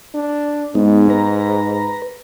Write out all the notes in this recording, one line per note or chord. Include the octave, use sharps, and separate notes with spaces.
D4
G#2 G#3 B3 D#4
B4 A#5